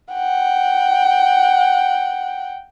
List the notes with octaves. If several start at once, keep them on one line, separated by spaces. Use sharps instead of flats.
F#5 G5